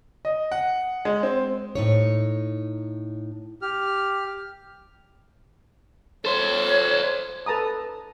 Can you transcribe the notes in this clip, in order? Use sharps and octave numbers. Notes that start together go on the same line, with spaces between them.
D#5
F#5
G#3
C4
A2 D#4 C#5
G4 F6
A4 C5 C#5
A4 B4 A5 A#5 D#6